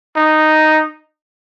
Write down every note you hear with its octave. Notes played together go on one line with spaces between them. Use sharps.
D#4